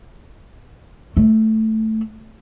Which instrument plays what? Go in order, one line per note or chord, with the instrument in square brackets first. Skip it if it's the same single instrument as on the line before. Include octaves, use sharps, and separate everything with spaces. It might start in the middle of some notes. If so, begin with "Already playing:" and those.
[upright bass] A3